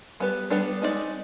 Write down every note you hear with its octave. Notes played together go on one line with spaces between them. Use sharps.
G3 B3 D4 G4 B4
G3 B3 D4 G4 B4
G#3 C4 D#4 B4 D5